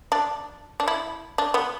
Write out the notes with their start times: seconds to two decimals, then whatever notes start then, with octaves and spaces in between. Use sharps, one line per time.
0.12 D4
0.80 D4
0.88 E4
1.38 D4
1.54 B3